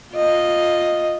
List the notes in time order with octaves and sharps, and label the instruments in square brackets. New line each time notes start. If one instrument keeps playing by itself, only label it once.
[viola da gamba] F4 D#5